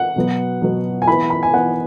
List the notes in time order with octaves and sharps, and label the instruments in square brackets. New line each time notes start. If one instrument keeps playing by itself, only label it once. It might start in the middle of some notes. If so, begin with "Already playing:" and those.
Already playing: [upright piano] F#5
B2 F#3 B3
B2 F#3 B3
G#5
E3 B3 B5
B5
G#5
E3 B3 F#5